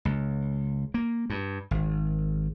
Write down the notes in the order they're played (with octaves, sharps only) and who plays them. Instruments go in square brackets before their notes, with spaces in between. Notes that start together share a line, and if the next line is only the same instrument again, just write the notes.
[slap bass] C#2
A#3
G2
G#1